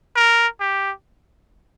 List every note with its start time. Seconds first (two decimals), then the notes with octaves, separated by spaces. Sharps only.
0.16 A#4
0.60 G4